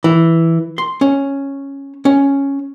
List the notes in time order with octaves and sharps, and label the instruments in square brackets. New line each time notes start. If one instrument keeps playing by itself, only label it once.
[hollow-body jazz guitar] E3
C6
C#4
C#4